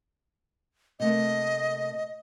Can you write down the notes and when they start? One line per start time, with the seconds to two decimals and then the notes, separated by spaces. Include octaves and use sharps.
1.00 C3 A3 A#3 D#5